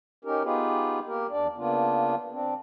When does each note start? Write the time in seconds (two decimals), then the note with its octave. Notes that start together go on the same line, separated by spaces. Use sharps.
0.25 C#4 D#4 G4 A#4
0.44 B3 D#4 F4 G4 G#4 B4
1.07 A#3 G4 A#4
1.31 E2 D4 D5
1.56 C#3 A#3 B3 D4 F4
2.32 C4 D4